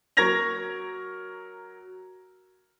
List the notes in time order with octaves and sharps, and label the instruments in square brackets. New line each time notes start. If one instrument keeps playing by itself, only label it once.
[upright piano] F#3 A#4 C#6 G#6 A#6 F7